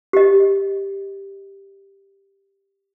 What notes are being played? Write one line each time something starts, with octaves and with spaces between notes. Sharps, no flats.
G4 D#5